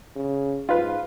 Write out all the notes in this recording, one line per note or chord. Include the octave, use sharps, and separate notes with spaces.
C#3
G#2 F4 B4